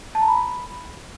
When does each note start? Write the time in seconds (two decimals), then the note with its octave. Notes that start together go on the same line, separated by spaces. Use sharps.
0.15 A5
0.22 A#5
0.28 B5